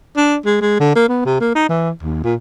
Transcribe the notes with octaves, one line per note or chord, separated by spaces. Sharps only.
D4
G#3
G#3
D3
A#3
B3
C3
A#3
D#4
E3
D#2
A#2